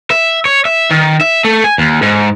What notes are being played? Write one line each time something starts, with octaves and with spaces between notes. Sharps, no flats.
E5
C#5
E5
D#3
E5
A3
G#5
D#2
G#2